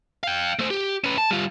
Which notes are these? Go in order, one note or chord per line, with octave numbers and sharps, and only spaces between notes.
F5 G5
A3 C5
G4
C#4 B4
A5
G3 F4